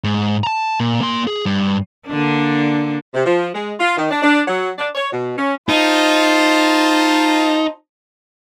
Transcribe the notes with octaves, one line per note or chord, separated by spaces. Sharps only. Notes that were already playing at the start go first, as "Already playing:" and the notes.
G#2
A5 A#5
A#2
A#3 C6
G#4
G2
D3 A#3 D4
C3
F3
G#3
F4
D#3
D4
D4
F#3
D4
C#5
B2
C#4
D#4 F4 C5 A5